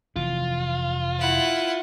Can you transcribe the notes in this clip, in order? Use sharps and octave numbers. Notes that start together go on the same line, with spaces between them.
F1 E3 F4
E4 F#5